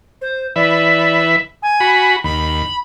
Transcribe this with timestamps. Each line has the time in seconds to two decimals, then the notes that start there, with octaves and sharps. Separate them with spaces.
0.21 C5
0.56 E3 B4 D5 E5
1.63 G#5
1.80 F#4 B5
2.24 D#2 B5